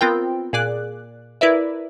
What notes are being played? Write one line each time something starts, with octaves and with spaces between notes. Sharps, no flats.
B3 C4 F4 A#4 G5
A#2 G#4 D5 F#6
E4 A#4 B4 D5 E5